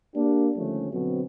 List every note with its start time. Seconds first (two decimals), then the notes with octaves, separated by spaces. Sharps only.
0.15 A#3 D4 G4
0.57 D#2 D3 F3 G3 A3 C#4
0.92 B2 D3 F#3 C4